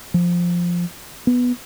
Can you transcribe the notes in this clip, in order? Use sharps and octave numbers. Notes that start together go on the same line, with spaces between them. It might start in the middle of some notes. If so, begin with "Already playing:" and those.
F3
B3